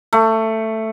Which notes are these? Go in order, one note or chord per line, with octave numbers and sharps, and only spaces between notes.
A3